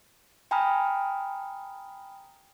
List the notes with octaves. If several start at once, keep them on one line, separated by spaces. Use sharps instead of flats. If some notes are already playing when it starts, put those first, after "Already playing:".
G5 G#5 A#5 B5 D#6 F6